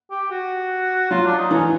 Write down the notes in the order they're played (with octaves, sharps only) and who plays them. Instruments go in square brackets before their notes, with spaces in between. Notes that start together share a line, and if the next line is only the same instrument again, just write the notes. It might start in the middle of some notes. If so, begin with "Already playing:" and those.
[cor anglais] G4
F#4
[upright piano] F#3 [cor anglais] F4
[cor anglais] D4
D#4
[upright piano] E3 [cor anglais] C#4